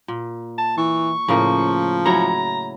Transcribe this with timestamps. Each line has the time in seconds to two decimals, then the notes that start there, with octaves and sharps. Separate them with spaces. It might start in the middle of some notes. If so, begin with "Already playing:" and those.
0.08 A#2
0.58 A5
0.78 E3 C#6
1.28 A2 C#3 F3 A#3
2.06 F#3 E4 C#5 A#5